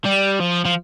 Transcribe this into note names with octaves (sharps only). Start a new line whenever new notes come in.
G3
F3
F3